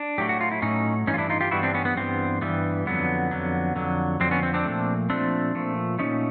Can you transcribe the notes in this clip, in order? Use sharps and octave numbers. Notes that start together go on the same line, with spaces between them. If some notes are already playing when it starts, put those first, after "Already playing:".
Already playing: D4
A2 F#3 A3 G4
F#4
F4
E4
A2 F#3 A3 C#4 D#4
G2 E3 C#4 D#4
F4
D4 E4
D#4 F4
F4 G4
G2 E3 G3 B3 E4 F#4
C4 D4
B3 C#4
B3
G2 E3 G3 B3 C4
G2 E3 G3 B3
F2 D3 F#3 B3
F2 D3 F#3
F2 D3 F#3
F2 D3 F#3 C4
B3 C#4
C4
C4 D4
A#2 F3 A3
A#2 F3 A3 C4 D4
A#2 F3 A3
A#2 F3 A3 C#4 D#4